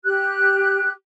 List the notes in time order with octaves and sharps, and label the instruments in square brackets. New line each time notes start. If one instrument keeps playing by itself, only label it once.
[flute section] G4 F#6